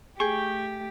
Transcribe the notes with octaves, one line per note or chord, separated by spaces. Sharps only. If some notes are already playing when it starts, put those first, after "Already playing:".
A3 G4 G#4 G5 C#6